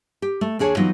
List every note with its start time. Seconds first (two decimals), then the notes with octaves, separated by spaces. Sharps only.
0.22 G4
0.41 A3
0.59 D#2 D4 G#4 C#5
0.77 E3 F#3 B3 D#4 F4